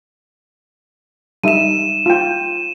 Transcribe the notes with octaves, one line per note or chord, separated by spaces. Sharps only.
G3 D#4 E5 D#7 E7
F4 G5